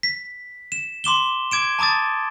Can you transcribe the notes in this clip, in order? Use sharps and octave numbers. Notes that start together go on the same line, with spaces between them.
B6
E7
C6 D6 E7 G7
D6 G#6 D7 E7
A5 A#5 D6 D#6 A6